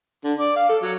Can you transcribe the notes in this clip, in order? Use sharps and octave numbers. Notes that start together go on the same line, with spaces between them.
D3
D5
F5
A4
F#3